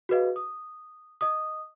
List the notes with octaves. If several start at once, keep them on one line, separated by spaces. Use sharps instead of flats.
F#4 G#4 B4 D#5 F5
D#6
D#5 D#6